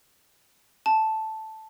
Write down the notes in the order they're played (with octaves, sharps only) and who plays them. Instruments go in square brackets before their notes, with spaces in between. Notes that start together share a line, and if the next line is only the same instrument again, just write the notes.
[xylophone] A5